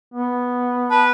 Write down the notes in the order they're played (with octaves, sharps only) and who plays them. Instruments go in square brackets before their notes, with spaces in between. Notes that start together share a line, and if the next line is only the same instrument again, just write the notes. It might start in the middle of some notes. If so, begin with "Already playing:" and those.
[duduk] B3
[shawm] B4 [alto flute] A5